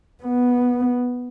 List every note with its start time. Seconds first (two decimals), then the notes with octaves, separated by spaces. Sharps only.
0.23 B3